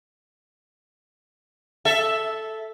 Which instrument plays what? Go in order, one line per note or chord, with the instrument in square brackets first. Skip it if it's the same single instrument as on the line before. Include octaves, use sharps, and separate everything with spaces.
[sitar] A4 E5